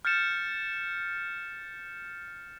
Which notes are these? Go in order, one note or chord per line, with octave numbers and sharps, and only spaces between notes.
F6 G6 A6 C#7 E7